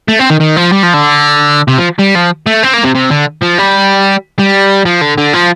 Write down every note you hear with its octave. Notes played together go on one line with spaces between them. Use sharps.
A3
C4
D#3
D#3
F3
G3
F3
D3
C3
F3
G3
F3
A3
C4
A#3
C3
C3
D3
F3
G3
G3
F3
D3
D3
F3